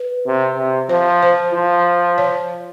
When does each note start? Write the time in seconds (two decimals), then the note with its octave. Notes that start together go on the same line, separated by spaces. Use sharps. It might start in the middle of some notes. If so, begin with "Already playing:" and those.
Already playing: B4
0.26 C3
0.58 C3
0.89 F3 C5
1.23 C5
1.54 F3
2.18 C#5